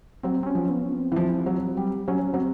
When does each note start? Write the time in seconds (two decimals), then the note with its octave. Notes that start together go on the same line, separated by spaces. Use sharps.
0.23 F#3 C4
0.43 C4
0.47 C#4
0.55 F3
0.70 B3
0.84 C#4
0.93 C4
1.12 E3
1.16 F3
1.46 F#3
1.77 G3
2.08 F#3 C#4
2.32 F#3 C4